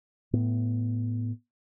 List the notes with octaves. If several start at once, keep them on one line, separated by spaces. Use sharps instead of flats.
A2 B3